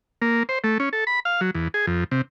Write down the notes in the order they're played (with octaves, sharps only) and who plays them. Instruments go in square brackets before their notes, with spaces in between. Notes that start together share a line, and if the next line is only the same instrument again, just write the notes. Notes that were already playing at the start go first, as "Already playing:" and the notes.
[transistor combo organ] A#3
C5
A3
C#4
A4
B5
F5
F#3
E2
G#4
F2
C3